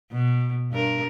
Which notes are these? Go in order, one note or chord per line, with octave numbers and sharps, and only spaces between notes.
B2
G2 A#4